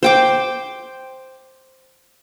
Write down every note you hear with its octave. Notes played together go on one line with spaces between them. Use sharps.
C5 G5 D6